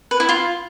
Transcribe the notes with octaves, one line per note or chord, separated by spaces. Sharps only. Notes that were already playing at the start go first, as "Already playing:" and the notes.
B4
E4
F4